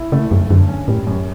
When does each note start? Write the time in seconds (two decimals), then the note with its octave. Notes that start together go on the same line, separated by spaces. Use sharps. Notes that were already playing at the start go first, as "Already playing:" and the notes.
Already playing: E4
0.12 C#3 A3
0.31 B1 F#2
0.50 F#2 D3
0.68 C#4
0.87 A2 G3
1.07 F#2